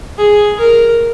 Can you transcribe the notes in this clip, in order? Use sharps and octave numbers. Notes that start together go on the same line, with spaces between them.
G#4
A#4